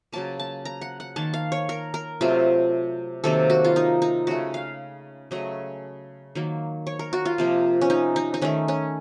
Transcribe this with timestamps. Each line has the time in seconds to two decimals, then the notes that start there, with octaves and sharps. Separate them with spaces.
0.13 C#3 F#3 A#3 A5
0.39 A5
0.65 A#5
0.81 F#5
1.00 F#5
1.16 D#3 A#3 A5
1.34 F5
1.52 C#5
1.69 A#4
1.94 A#4
2.21 C3 F#3 A3 F4
3.24 C3 D#3 F#3 A#3 A4
3.50 F#4
3.64 F4
3.76 D#4
4.02 D#4
4.27 C#3 A3 F#4
4.54 F5
5.31 C#3 F#3 A3 D#5
6.35 D#3 F#3 A#3
6.87 C#5
6.99 A#4
7.13 F#4
7.25 F4
7.38 C3 F3 A#3
7.81 C#4
7.90 D#4
8.16 D#4
8.34 D#4
8.42 D#3 A3 C#4
8.68 C#4